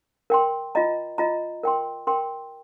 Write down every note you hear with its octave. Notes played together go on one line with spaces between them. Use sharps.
A#4 G5 C6
F4 D#5 A#5
F4 D#5 A#5
A#4 G5 C6
A#4 G5 C6